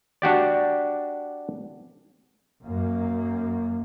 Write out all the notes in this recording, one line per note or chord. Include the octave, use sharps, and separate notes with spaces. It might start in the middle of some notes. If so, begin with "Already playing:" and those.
D4 F#4 G4 D5
F#2 A#3